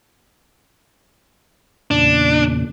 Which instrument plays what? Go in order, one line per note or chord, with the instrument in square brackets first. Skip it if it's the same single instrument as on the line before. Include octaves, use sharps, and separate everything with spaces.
[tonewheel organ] E2 A#2 C#3 [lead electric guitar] D4